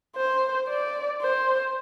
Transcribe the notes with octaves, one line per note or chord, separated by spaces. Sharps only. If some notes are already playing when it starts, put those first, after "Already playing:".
C5
D5
C5